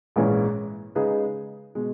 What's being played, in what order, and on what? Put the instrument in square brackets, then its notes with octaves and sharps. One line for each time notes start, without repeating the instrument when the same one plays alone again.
[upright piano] A#1 G#2 E3 G#3 C#4
C#3 G#3 D#4 G#4 B4
B2 G#3